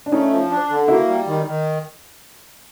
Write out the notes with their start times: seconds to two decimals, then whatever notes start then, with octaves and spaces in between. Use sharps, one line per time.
0.06 D4
0.12 A3 C#4 D#4
0.31 F3
0.50 D4
0.70 D3
0.88 A#3 E4 F#4
1.08 G3
1.27 D#3
1.46 D#3